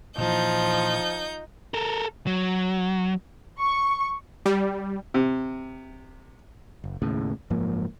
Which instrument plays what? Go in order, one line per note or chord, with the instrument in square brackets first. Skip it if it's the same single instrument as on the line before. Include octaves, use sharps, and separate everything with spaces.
[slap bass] A#2 E3 [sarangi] F3 [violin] D#4 G6
[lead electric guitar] A4 A#4
F#3
[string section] C#6
[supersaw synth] G3
[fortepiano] C3
[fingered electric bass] F#1
D#2 A2 C#3
F#1 G#2 F3 A#3